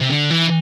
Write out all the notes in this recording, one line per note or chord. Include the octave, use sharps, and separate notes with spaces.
C3
D3
E3